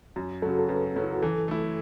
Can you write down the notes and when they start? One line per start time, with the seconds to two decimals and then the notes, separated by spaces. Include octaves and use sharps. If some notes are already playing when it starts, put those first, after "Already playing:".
0.16 F#2
0.42 F#3 A4
0.47 C#3 F#4
0.59 A4
0.69 F#2 B4
0.93 C#3 F#3 C#4
1.03 E4
1.13 F#4
1.22 E3 A4
1.48 A3 E4